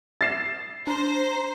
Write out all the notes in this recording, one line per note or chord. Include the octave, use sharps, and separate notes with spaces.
A6 C7 E7
D4 C5 A#5